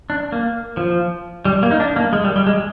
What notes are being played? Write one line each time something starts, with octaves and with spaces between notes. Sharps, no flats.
D4
A#3
F3
G3
A#3
D#4
D4
A#3
G#3
G3
G3
G#3